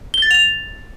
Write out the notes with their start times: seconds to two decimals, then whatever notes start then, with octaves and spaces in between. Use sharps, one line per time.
0.14 G7
0.22 A6
0.31 F7